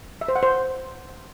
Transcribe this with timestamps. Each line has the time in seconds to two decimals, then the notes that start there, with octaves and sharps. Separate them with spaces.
0.21 E5
0.28 C5
0.36 F#5
0.43 C5